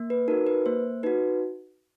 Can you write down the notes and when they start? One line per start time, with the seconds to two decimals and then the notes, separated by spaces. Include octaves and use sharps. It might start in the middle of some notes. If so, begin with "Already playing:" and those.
Already playing: A#3
0.10 B4
0.28 D#4 F#4 A#4
0.47 B4
0.66 A#3 C5
1.03 D#4 F#4 B4